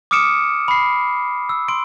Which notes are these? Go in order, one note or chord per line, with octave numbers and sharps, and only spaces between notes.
D6 D#6 F6 C#7 D7 E7
B5 C7
E6
C6 D7